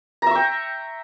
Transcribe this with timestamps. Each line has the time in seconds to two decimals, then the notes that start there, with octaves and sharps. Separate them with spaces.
0.22 A#5
0.27 E5
0.31 C#6
0.35 G5